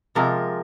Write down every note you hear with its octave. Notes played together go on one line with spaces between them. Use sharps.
C3 F3 G#3 A#4